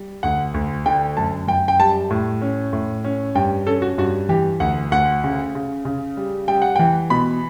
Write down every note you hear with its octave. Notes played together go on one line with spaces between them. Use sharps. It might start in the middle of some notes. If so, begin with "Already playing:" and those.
Already playing: G3
D2 F#5
D2
D3 G5
F#2 A5
F#2 G5
G5
G3 A5
A2
C#4
A2
C#4
G2 G5
C#4 A4
F#4
G2 F#4
E3 G4
D2 F#5
D2 F#5
C#3
C#3
C#3
G3
G3 G5
F#5
E3 G5
B2 B5